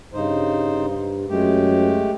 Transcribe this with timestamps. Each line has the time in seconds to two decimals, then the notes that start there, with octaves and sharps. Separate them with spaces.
0.14 G2 C#3 D#4 C5
1.29 F#2 G#3 A3 G4